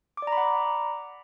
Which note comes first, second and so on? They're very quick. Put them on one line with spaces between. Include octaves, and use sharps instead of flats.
D6 D5 A#5 B5 F#5